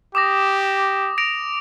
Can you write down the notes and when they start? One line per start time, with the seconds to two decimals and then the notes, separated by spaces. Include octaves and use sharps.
0.15 G4 D6 D#6 A#6
1.18 A#6 D7 F7